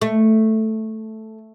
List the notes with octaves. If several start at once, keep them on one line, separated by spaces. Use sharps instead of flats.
A3